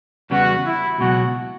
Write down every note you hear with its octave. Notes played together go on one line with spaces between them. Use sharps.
E2 C#3 G3 B3 F#4
E4
C#2 B2 F#3 F#4